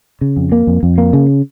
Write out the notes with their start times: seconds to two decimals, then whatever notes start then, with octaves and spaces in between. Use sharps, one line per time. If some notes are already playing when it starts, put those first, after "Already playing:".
0.21 C#3
0.37 F2
0.52 A#3
0.67 F2
0.83 F2
0.98 A#3
1.13 C#3